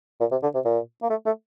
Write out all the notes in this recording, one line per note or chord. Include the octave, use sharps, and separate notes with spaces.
A#2
C3
D3
C3
A#2
A#3
A3
A3